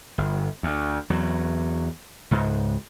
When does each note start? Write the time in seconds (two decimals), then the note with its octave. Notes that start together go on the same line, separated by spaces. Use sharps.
0.18 G1
0.63 D2
1.10 E2 F#3
2.31 C#2 G#2